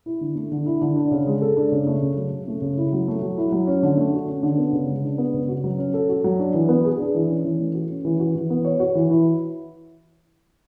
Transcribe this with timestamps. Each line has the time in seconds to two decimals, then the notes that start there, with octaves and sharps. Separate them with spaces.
0.06 E4
0.21 D3
0.35 A3
0.52 D3
0.66 E4
0.81 D3
0.96 D4
1.11 C#3
1.27 G#3
1.41 A4
1.57 D4
1.72 C#3
1.87 A3
2.02 C#3
2.16 F#3
2.32 C#3
2.48 A3
2.62 C#3
2.77 E4
2.93 F#3
3.08 A3
3.22 F#3
3.37 E4
3.52 F#3
3.67 C#4
3.83 D3
3.97 A3
4.13 F#4
4.28 C#4
4.43 D3
4.58 B3
4.73 C#3
4.89 G#3
5.04 D4
5.18 B3
5.34 C#3
5.49 F#4
5.64 F#3
5.78 C#4
5.94 A4
6.09 F#4
6.24 F#3
6.39 D4
6.54 E3
6.68 B3
6.85 G#4
6.99 D4
7.15 E3
7.30 C#4
7.45 E3
7.59 A3
7.74 F#4
7.90 C#4
8.05 E3
8.19 F#4
8.35 E3
8.50 B3
8.65 C#5
8.80 F#4
8.95 E3
9.10 E4